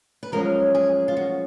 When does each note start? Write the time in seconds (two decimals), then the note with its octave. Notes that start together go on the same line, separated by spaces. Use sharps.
0.23 B4
0.32 F#2 F3 G#3 C#4 A#4
0.75 G#4
1.08 F4
1.17 F#4